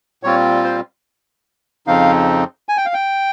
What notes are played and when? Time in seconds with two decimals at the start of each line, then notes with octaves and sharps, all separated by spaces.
0.23 A#2 G3 C4 F4 C#5
0.64 C5
1.87 F2 C#3 F3 C4 D#4 F5
2.69 G#5
2.77 G5
2.86 F5
2.94 G5